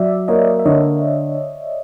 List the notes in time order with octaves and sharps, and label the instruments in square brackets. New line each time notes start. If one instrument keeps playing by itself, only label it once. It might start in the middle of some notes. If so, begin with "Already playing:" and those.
Already playing: [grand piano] F#3 [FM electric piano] D5 E5
[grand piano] A#3 [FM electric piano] C#5 D#5
[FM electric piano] E5
[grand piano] D3 [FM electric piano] C#5 D#5